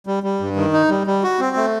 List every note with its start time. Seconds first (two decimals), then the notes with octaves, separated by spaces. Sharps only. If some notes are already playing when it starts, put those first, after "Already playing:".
0.07 G3
0.23 G3
0.40 G2
0.56 D#3
0.73 D#4
0.90 G3
1.07 G3
1.24 F#4
1.40 C4
1.56 A3